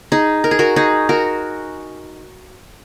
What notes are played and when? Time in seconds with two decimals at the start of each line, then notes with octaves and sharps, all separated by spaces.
0.12 D#4 G#4
0.44 A#4
0.51 G#4
0.59 F#4 A#4
0.76 D#4 G#4
1.09 F#4 A#4